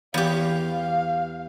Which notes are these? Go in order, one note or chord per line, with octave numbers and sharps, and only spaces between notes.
E2 G4 F5